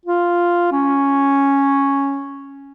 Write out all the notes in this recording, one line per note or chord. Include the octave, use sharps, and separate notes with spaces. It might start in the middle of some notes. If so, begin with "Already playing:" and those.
F4
C#4